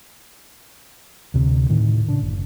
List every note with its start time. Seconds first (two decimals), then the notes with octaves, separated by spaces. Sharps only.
1.34 D2 C3
1.70 A2 D#3
2.08 C#3 D4
2.21 F#1